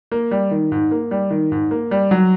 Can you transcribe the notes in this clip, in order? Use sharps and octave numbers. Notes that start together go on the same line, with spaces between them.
A#3
G3
D#3
G#2
A#3
G3
D#3
G#2
A#3
G3
F#3